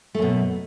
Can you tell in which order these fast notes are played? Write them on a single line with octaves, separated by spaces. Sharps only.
A3 F#2 B2